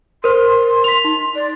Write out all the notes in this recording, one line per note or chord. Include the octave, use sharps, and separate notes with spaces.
A#4 C5 C6
B6 F7
D#4
D5